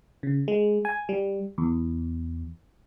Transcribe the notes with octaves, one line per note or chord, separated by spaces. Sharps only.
C#3
G#3
G#5
G3
E2